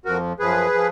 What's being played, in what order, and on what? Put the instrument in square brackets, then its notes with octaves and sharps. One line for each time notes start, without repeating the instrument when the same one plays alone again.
[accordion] F2 F3 F#4 A#4
F#2 F3 G#4 B4
F3